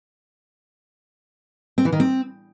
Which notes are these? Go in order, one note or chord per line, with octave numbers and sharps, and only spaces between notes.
C4
E3
D#3
C4